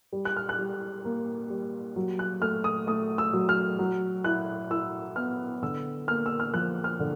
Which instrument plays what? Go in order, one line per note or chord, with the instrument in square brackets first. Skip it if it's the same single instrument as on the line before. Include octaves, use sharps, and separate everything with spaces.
[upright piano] G3
F#6
F6
F#6
G3
A#3
G3
F#3
F#6
A3 F6
D#6
A3 D#6
E6
F#3
F6
F#3
E4 F#6
E4 E6
B3 F6
D3 E6
A#3 F6
E6
F6
F3 F#6
F6
D3